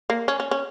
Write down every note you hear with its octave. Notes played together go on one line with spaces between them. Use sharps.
A#3
C#4
C#4
C#4